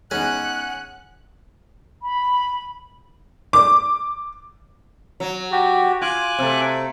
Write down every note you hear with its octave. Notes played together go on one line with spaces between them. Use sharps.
G#3 B3 C#4 D#4 F#5 F#6
B5
D6
F#3
F#4 G4
F4 G#5 D6 F#6
C3 A3